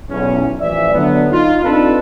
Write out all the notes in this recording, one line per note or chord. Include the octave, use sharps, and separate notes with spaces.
B1 E2 C#4
A1 E3 F3 D5 E5
D3 F#3 B3
D#4 F4
C4 D4 D#4 F4 A4 B4